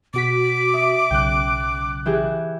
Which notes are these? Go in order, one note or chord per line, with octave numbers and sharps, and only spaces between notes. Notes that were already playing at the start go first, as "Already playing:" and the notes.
B2 F#4 D6 B6
E5 D#6
B1 C#3 G5 F#6
E3 G4 G#4